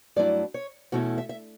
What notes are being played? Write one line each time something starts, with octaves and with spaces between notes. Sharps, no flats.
G2 F#3 A3 E4 D5
C#5
E2 B2 A3 C#4 E4 F#4
E5
E5